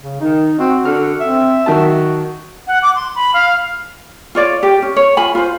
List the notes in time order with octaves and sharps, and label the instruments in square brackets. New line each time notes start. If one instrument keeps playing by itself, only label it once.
[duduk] C#3
[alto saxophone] D#3 [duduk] D#4
[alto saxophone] C4 [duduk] F#4
[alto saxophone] D3 [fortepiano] F6
[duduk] C4 [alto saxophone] E5
[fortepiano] D#3 F#3 A5 [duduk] F#4
[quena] F#5
D6
C6
B5
F5
[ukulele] F4 C#5 D5
G4
C#4
C#5
F4 G#5 B5
F4 C5